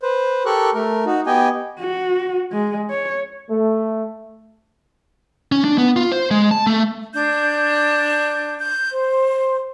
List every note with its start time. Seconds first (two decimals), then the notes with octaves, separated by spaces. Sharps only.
0.03 B4 C5
0.46 G4 A4 A#4 C#6 F#6
0.74 A3 A#4
1.06 D#4 F#4
1.26 B3 G4 D#5 G5 G#5
1.78 F#4
2.52 G#3
2.90 C#5
3.50 A3
5.52 C#4
5.64 D4
5.78 B3
5.96 F4
6.12 C5
6.31 G#3
6.51 A5
6.67 A3
7.14 D4 G6
8.59 G6
8.91 C5